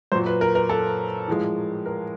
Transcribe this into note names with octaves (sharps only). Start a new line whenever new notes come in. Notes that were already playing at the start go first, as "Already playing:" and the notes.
A#2 F#3 C5
B4
A#4
A#4
A4
A2 F3 G#3
A#4